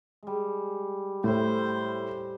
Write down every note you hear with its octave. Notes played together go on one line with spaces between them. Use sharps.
G3 G#3
A2 C5